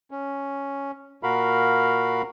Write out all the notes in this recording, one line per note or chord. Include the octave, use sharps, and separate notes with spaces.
C#4
A#2 F#4 A#4 F5 B5